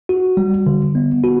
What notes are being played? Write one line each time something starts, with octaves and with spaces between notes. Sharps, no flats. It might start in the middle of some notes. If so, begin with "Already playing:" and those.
F#4
G3
D3
B3
F#4